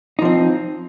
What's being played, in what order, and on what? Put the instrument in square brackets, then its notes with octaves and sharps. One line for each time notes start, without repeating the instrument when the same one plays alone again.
[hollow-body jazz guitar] D#4
F3
C4